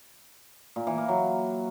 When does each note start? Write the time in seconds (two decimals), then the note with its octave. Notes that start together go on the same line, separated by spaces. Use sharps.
0.76 A#2
0.87 E3
0.98 A#3
1.09 F#3